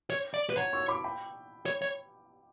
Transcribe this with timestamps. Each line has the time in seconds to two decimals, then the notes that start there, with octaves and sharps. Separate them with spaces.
0.10 C#5
0.34 D5
0.50 B4
0.57 C#5 F#5 A#5
0.73 C#6 E6
0.88 B5 D6
1.04 G5 B5
1.66 C#5
1.82 C#5